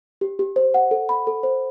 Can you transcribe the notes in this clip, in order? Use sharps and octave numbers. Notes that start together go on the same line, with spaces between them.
G4
G4
C5
F#5
A4
B5
A4
C5